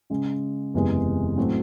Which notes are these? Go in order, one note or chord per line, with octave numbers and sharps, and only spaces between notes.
C#3 G#3 C#4
F#1 E2 C3 E3 G#3
A2 F#3 A3 C4 F#4